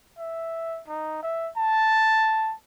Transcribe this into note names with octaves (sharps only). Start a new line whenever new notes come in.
E5
D#4
E5
A5